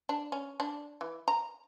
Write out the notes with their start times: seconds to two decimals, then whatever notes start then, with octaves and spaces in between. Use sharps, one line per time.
0.09 D4
0.32 C#4
0.60 D4
1.01 E3
1.28 A#5